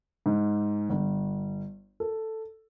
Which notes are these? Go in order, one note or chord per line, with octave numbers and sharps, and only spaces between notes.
G#2
G1
A4